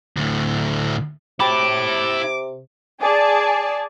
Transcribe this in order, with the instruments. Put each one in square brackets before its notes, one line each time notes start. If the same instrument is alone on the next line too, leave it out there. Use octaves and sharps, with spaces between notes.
[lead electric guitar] D2 A2
[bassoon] C3 [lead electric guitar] E4 A5 [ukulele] F#4 G5 B5 [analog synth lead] D6
[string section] G#4 D5 A5